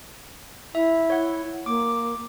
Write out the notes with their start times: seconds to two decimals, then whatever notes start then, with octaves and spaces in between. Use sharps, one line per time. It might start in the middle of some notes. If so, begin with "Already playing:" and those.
0.75 E4 E5
1.10 C#5 F#5
1.66 A#3 D6